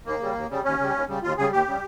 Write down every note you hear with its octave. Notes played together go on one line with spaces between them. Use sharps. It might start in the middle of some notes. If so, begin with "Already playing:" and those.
D#2 A#3
C#3 G3
D#2
C#3 G3
D#2 C#4
C#3 G3
D#2
C#3 G3
D#2 F4
C#3 G3 G#4
D#2 G4
C#3 G3